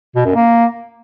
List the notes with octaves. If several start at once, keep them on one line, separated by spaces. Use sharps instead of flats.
B2
F#2
A#3